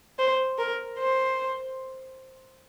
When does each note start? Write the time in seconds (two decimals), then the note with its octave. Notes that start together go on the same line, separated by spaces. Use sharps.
0.19 C5
0.59 A#4
0.99 C5